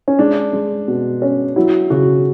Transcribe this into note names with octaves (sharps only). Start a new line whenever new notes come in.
C#4
G#3 D4
G#3
B2
C#4
F#3 E4
C#3 F#4